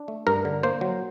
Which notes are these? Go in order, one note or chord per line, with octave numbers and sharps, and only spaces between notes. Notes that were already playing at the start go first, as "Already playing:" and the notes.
Already playing: D4
A3
G2 A#4
D3
A#3 C5
F#3